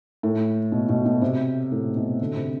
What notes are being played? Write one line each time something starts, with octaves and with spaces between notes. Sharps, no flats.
A2
B2
B2
B2
C3
A2
B2
D3
C3